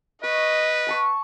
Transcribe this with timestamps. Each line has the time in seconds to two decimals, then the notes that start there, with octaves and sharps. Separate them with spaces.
0.23 B4 D#5 C#6
0.87 F#5 A5 C#6